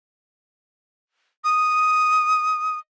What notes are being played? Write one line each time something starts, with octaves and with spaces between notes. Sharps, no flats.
D#6